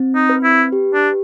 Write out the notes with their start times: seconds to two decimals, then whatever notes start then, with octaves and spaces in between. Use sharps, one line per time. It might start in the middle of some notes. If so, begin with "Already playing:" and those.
Already playing: C4
0.15 D#4
0.29 B4
0.44 E4
0.72 G4
0.94 D4